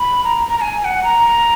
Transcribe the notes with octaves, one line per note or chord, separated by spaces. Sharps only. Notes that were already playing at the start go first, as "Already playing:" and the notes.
Already playing: B5
A#5
A#5
A#5
G#5
G#5
F#5
A#5